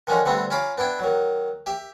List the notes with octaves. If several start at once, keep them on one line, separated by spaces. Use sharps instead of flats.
D3 D#3 F3 G#3 C#4 D#4
D3 G3 A3 B3 C4
C#4 F4 F5 A#5 B5 D6
B3 D4 E4 G5
D#3 F#3
G4 E5